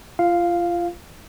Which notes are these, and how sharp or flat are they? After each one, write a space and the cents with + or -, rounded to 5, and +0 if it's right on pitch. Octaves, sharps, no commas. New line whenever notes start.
F4 -25 F5 +0